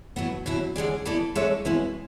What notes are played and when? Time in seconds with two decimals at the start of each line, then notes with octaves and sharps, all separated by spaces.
0.16 A2 F#3 B3 E4
0.46 B2 F#3 C#4 E4
0.76 D3 G#3 C#4 G#4 D5
1.06 E3 B3 E4 A4 D5
1.35 G#3 D4 A4 C#5 E5
1.65 B2 G#3 C#4 E4 B4